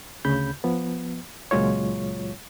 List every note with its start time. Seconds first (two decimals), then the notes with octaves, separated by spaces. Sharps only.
0.25 D2 C#3 B5 G6
0.64 F3 B3
1.51 C#2 A#2 F#3 G#3 F4 C#5